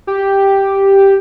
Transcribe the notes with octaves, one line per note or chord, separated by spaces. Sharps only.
G4